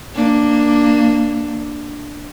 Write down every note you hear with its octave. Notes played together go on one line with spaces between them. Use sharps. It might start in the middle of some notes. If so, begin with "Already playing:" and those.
A#3 D4